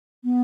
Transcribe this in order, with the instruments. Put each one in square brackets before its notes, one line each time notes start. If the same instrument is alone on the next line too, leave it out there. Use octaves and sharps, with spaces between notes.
[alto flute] B3